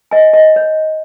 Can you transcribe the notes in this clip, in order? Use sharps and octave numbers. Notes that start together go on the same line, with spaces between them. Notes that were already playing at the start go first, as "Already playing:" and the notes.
D#5 G#5
D#5
C#5